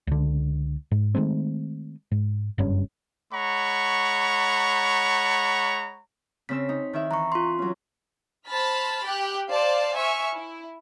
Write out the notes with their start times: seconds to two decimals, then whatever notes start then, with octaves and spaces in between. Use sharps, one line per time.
0.07 C#2 D3
0.91 G#2
1.15 D#3 G#3 A3 C4
2.12 G#2
2.58 F#1 G2 C#4
3.33 G#3 C#5 F#5 A#5 B5 C#6
6.49 C#3 C4 E6 B6
6.69 D#4
6.93 D#3 E4 E5
7.11 E3 A#5 C#6
7.32 F4 C6
7.58 F#3 C#4
8.48 C5 A5 B5 F6 A6 B6
9.06 G4 G5 F#6
9.51 C5 D5 F5 A5
9.97 E5 G#5 C#6 F6
10.35 E4